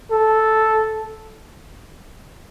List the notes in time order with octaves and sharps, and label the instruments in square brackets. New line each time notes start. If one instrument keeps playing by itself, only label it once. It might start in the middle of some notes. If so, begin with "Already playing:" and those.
[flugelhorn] A4